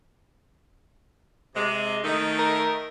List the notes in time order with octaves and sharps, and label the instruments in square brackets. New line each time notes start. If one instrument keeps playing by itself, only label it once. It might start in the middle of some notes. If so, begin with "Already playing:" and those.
[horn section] C3 G#3
D#3 A3 D#4
[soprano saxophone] A#4